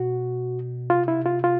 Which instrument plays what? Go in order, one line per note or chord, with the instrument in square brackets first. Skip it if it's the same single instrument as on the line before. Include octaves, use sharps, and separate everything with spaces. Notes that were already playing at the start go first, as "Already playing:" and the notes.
Already playing: [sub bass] B2 [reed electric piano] F#4
[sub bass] C3 [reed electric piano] F4
[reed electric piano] E4
F4
F4